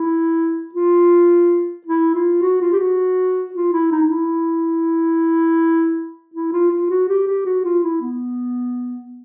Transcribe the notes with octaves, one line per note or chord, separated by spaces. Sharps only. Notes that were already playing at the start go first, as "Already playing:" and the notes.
Already playing: E4
F4
E4
F4
F#4
F4
G4
F#4
F4
E4
D#4
D#4
E4
E4
F4
F4
F#4
G4
G4
F#4
F4
E4
B3